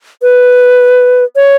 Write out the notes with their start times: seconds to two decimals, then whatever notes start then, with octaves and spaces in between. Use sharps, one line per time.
0.22 B4
1.36 C#5